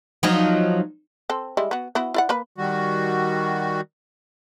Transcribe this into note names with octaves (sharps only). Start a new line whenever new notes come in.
F3 F#3 D#4
C4 A4
G3 G#3 E4
B3 F#4
B3 E4 F#4
E4 D5 F#5
A#3 B4 B5
D#3 G3 F#4